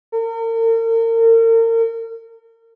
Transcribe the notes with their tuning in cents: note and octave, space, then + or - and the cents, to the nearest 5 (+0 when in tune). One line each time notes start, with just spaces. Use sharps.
A#4 -40